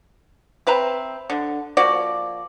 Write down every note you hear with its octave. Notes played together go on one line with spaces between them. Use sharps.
C4 B4 E5 A#5
D3
F3 A#3 F#4 D5